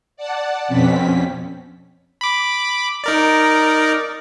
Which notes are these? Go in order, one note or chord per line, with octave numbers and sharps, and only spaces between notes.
D5 F#5 A5
F2 B2 C4 C#4 B6
B5 D6
D#4 A#4 D5